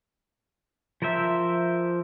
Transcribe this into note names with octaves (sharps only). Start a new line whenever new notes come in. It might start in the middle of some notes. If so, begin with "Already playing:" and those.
F3 A#4 C5 E5